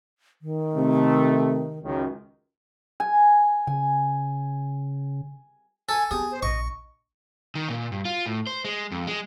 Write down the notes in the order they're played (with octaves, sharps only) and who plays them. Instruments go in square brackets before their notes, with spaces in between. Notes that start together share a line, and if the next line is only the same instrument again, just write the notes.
[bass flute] D#3
[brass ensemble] C3 A3
C#2 F#2 D#3
[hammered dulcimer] G#5
[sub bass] C#3 [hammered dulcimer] G#5
[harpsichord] A4 [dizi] G#5
[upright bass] B3 [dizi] G4 [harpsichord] G#4
[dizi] C5
[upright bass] A#1 [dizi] D#5 [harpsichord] C#6
[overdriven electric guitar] D#3
A#2
G2
F4
A2
C5
G#3
F2
G#3